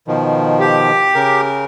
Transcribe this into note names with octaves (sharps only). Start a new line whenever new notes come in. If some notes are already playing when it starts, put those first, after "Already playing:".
B2 D#3 F3
G4
C#3 A#4